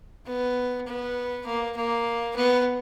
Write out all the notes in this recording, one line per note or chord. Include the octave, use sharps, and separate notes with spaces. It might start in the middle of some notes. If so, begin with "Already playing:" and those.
B3
B3
A#3
A#3
B3